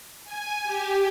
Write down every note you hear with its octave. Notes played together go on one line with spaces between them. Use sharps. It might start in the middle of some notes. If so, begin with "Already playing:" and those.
G#5
G4